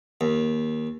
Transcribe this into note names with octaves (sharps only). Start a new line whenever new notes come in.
D#2